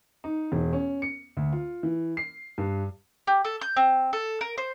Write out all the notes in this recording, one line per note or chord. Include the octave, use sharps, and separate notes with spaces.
D#4
E1
C#4
C#7
D2
F4
E3
C7
G2
G4
A4
G6
C4
A4
A#4
C5